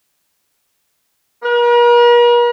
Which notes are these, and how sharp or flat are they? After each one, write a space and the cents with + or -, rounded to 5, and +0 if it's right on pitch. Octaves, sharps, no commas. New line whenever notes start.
A#4 +45